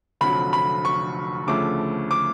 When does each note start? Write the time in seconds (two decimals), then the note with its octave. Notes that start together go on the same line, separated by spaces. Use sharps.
0.21 F1 F2 D3 F#3 B5
0.53 B5
0.85 C#6
1.47 D2 C#3 F3 A3 D6
2.11 D6